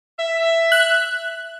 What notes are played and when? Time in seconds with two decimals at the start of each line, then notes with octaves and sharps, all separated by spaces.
0.18 E5
0.72 F#6